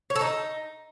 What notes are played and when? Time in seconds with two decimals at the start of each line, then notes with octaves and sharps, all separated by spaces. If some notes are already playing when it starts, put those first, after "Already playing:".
0.10 C#5
0.16 A4
0.21 D#4